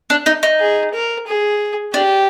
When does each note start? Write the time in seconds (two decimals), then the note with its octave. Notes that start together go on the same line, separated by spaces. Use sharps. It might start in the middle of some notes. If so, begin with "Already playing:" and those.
0.10 D4
0.26 D#4
0.43 D#4
0.59 G#4
0.94 A#4
1.27 G#4
1.94 D4 G4